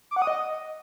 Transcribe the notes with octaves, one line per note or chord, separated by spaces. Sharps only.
D6
F#5
D#6
D#5